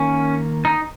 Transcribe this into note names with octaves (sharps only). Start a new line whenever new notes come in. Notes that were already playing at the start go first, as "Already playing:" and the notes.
Already playing: D#3 A#3 C#4
D#4